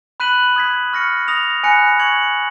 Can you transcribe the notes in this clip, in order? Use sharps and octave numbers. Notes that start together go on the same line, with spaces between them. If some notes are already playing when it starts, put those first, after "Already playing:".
B5 F#6 B6 D#7 F#7
D#6 G#6 B6
C#6 F6 A#6 C#7
D#6 A#6 F7
G#5 B5 F#6 A#6 C#7
C#6 G#6 C#7 F#7